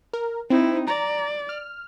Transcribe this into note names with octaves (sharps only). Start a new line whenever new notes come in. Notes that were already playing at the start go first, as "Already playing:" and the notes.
A#4
C4 D#4 E4
D5 A#5
F6